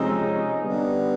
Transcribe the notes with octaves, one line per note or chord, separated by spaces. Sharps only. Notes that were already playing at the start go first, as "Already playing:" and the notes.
Already playing: C3 F3 G#3 C4 C#4 D#4
D3 G3 B3